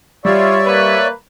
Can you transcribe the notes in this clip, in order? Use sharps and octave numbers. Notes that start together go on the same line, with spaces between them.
G3 F4 C#5 D5 E5
A#3 B4